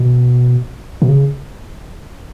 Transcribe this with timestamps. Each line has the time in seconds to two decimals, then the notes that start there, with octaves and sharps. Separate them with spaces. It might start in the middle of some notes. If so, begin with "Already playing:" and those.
Already playing: B2
1.02 B2
1.09 C#3